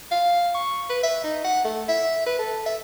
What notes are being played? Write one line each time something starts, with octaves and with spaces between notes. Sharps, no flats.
F5
C#6
B4
E5
D#4
F#5
A3
E5
B4
A4
E5